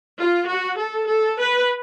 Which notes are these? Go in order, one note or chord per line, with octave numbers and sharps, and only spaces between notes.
F4
F#4
A4
A4
B4